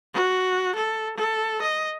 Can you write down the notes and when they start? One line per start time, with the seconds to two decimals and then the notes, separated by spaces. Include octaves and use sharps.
0.14 F#4
0.75 A4
1.17 A4
1.62 D#5